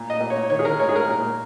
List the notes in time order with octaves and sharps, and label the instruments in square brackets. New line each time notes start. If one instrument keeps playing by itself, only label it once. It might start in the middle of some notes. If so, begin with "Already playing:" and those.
Already playing: [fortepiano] A#2
D#5
A#2
C#5
D#3 C#5
G#4
A#4
G#2 C#5
G#4
A#4
A#2